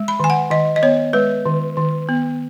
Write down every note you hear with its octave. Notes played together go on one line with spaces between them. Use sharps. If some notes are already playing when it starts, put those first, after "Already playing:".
Already playing: G#3
B5
D#3 G#5
F#5
D#3 D#5
D#5
B3 C#5
G#3 B4
D#3
D#3
B3